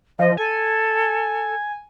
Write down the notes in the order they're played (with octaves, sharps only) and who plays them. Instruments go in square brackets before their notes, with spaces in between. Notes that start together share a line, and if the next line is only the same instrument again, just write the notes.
[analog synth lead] F3 [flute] D#5
[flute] A4 [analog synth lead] G#5